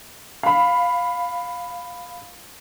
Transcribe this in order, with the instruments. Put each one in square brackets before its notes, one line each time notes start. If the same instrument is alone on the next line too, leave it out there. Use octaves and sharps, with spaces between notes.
[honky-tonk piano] F5 B5